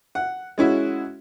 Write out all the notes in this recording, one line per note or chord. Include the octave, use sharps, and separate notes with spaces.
F#5
G#3 C#4 E4 F#4